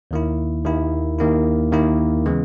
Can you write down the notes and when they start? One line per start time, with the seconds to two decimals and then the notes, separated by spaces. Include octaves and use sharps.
0.11 D#2 D#3 A#3 E4
0.65 D#2 D#3 A#3 E4
1.19 D#2 D#3 A#3 E4
1.72 D#2 D#3 A#3 E4
2.26 C#3 E3 G#3 B3